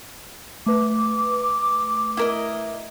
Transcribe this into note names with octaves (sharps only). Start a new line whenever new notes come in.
A3 B4 D6
E4 A#4 D#5